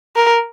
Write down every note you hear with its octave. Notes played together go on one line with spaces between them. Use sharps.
A#4